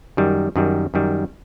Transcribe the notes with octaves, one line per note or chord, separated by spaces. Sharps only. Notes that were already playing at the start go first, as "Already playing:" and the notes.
F#2 D#3 G3
F#2 D#3 G3
F#2 D#3 G3